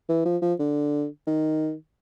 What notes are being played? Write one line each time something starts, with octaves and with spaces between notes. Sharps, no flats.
E3
F3
F3
D3
D#3